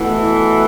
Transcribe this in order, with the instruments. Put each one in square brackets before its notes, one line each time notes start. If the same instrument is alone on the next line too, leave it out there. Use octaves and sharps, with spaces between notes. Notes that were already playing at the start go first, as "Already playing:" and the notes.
Already playing: [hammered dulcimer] B2 A3 E4 [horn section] E3